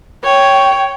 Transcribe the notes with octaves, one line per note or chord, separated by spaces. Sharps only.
C#5 G5